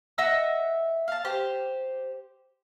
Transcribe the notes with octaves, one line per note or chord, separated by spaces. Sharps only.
D#5 E5 F#5 E6
F5 A5
G4 C5